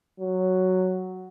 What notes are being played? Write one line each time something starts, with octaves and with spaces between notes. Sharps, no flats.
F#3